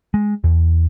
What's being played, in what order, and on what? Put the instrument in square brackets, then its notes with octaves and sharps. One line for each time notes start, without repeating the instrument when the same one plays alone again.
[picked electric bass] G#3
E2